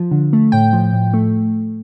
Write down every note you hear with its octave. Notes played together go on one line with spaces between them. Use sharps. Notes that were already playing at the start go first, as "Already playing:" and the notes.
Already playing: F3
D3
A3
A2 G5
F3
A2
A3